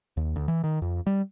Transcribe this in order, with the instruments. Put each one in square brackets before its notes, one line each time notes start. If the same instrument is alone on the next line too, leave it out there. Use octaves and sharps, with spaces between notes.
[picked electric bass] D#2
D2
E3
D#3
F2
G3